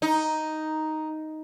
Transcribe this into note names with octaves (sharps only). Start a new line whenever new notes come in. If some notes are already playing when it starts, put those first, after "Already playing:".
D#4